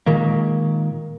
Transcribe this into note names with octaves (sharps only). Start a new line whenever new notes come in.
A#2 D#3 G#3 A#3